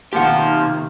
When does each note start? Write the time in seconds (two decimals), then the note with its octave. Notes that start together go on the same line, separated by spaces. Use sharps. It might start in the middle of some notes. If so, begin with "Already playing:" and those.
0.13 B1 C3 D#3 F3 A#3 G4 F#5